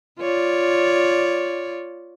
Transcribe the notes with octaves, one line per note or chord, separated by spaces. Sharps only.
F4 C#5 D5